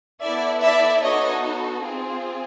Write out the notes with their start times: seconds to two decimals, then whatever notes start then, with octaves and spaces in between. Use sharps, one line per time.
0.22 B3 E4 A4 D5 E5
0.62 D5 E5
1.02 B3 D#4 F#4 A4 C#5 D#5
1.83 C4 F4 G#4